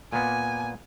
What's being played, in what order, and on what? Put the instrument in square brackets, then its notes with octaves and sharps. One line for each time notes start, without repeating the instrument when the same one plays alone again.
[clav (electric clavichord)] A#2 A#3 B3 [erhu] G#5